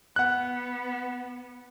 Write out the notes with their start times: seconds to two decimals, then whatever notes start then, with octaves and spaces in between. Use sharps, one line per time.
0.16 B3 F#5 F#6